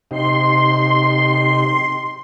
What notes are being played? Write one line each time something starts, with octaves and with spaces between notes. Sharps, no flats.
C3 D#4 G4 C6